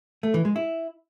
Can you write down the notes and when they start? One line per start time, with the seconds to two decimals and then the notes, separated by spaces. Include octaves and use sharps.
0.23 A3
0.34 E3
0.45 G#3
0.56 E4